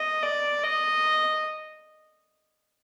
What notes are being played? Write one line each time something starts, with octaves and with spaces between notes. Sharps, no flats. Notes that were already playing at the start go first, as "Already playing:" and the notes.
Already playing: D#5
D5
D#5